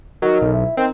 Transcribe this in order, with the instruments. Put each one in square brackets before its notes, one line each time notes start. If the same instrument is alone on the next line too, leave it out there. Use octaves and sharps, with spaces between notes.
[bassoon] D#3 [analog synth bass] F#3
[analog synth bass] B1
[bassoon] E4
[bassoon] D#3 [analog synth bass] C4